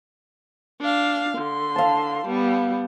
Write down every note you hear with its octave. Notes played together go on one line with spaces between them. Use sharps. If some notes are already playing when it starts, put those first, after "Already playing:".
D4 F5
D3 C6
F5 A5
G3 B3